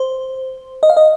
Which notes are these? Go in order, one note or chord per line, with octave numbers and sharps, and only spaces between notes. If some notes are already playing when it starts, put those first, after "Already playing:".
Already playing: C5
D#5
F5
D#5